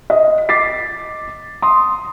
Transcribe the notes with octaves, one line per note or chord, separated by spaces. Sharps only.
D#5
D6 A6 B6 C7
C6 D#6